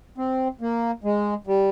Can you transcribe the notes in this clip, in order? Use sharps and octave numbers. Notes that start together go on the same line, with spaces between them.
C4
A#3
G#3
G3